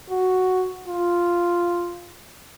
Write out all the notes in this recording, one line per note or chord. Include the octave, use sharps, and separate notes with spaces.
F#4
F4